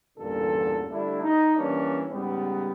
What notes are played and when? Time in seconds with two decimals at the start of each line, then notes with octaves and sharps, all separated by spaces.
0.17 A1 E2 G2 A#2 D3 A4
0.90 D3 G3 A3 D4 E4
1.21 D#4
1.56 E3 G3 A#3 C#4 D4
2.10 G#2 C#3 G3 B3